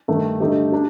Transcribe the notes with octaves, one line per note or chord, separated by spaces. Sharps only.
G2 D#3 A3 D4
G2 D3 A3 D#4 G4
D4 G4